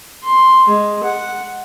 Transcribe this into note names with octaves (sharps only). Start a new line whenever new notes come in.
C6
G#3
F#5